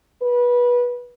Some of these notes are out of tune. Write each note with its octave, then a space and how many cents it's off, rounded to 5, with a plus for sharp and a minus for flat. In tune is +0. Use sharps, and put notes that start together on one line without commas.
B4 -20